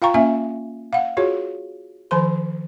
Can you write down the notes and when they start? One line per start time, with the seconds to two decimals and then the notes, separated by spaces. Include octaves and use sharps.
0.02 F4 F5 G5 A#5 C#6
0.14 A#3 C#4 E5 G#5
0.93 F5 F#5
1.17 F4 F#4 G#4 C#5
2.11 D#3 F3 C5 C6